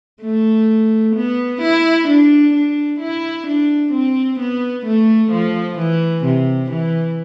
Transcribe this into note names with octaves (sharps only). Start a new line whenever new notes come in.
A3
B3
E4
D4
D4
E4
D4
C4
B3
A3
F3
E3
C3
E3